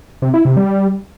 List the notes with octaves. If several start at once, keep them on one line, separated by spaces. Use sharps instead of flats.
C3
E4
C3
G3